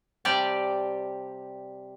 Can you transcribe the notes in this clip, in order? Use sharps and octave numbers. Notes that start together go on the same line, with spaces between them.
C3 G3 G4 D5 G5 A5